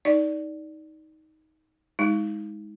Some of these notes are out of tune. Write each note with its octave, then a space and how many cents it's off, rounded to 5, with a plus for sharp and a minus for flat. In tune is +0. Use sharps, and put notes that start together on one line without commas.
D#4 +15 D5 +0
G#3 +0 D#4 +30